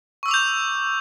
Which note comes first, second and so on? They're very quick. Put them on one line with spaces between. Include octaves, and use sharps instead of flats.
C#6 E6 D6 F7 G6